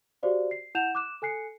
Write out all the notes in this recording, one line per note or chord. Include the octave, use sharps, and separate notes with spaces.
F#4 G4 C5 D5 F5
C7
E4 F#5 G6 E7 F7
D6 F#6 E7
A4 G#5 F#6 C7 C#7